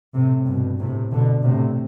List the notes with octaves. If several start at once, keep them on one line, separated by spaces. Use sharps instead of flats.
A2 C3
G2 B2
A2 C3
B2 D3
A2 C3